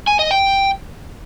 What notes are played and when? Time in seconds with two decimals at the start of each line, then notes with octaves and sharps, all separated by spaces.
0.07 G#5
0.19 D#5
0.31 G5